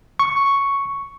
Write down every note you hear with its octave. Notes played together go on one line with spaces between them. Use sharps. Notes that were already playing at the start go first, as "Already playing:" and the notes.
C#6